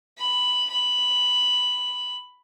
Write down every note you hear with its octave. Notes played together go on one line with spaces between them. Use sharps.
B5
B5